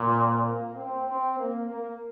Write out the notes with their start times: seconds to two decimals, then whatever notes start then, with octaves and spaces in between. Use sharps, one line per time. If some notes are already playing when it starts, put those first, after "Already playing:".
Already playing: A#2
0.13 C4
0.44 A#3
0.75 C4
1.07 C4
1.39 A#3
1.70 A#3